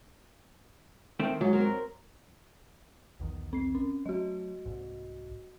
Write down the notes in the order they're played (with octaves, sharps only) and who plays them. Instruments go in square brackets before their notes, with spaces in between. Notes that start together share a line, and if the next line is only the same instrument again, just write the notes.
[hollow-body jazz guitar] D#3 A3 C4
[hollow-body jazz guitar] G#2 [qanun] F#3
[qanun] C4 A#4
[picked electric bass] B1 E2 D#3
[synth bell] C4 C7
C#4
[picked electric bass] F#3 A3 [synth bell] F#4 D#5
[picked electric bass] C2 G#2